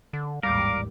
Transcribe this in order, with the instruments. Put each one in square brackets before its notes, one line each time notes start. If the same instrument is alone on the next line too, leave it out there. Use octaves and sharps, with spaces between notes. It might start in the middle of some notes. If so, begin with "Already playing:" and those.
[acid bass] D3
[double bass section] A1 D#2 G#2 [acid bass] G3 [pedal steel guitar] A#4 [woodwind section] F5 D6